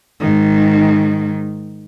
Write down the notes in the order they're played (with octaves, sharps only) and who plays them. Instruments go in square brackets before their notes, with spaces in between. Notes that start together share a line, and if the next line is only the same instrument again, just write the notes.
[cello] G#2 D#3